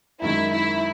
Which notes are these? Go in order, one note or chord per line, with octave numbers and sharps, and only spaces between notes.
F#2 D#3 G#3 E4
E4